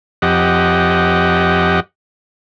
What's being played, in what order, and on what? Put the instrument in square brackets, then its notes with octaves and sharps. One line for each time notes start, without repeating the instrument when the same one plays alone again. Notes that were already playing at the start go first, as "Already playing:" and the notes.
[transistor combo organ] F2 G4 D#5 F#5